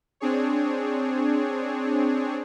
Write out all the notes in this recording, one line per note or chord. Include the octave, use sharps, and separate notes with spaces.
C4 D4 G#4 C#5